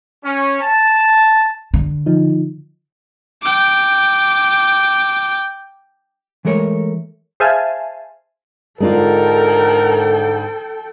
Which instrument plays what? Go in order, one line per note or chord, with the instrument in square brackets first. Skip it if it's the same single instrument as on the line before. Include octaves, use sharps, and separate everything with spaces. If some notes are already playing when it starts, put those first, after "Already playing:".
[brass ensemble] C#4
A5
[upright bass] D3
[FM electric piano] F3 D#4
[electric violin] G5 D6
[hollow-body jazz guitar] E3 G#3 A3 A#4 C#5
[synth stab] G#4 C5 E5 F5 G#5 A5
[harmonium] G#2 D3 [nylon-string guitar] G#3 D4 F4 [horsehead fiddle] A4 G5 [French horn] A#4